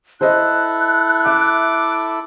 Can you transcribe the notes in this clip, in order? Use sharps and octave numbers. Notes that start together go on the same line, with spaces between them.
E4 A4 C5 D#5 F#6
E5 D6